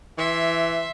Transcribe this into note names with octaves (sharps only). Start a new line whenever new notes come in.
E3 E5 C6